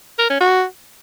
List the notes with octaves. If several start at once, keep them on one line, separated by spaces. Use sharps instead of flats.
A#4
C#4
F#4